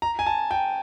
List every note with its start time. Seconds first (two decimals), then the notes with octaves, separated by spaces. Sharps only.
0.02 A#5
0.19 G#5
0.26 A5
0.51 G5